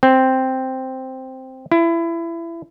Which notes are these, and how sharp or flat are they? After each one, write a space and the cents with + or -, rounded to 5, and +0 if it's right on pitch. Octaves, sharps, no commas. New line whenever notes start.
C4 +0
E4 +25